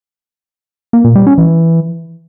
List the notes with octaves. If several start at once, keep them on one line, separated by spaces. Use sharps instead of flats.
A#3
A#2
G3
C#4
E3